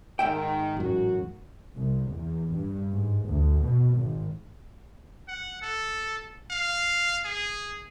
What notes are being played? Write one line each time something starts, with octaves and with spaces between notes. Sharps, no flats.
G#2 D#3 E5 G5
A1 F#2 F#4
C2
E2
G2
G#2
D2
B2
G#1
F#5
A4
F5
G#4